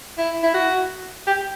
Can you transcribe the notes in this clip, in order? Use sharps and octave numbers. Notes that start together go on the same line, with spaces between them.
E4
E4
F#4
G4